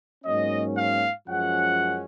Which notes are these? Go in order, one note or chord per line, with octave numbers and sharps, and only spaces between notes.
G#2 F#3 A#3 C#4 D#5
F5
F#2 F3 G#3 C#4 F#5